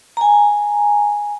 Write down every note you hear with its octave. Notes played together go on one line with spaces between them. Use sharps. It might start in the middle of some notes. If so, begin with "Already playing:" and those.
G#5 A#5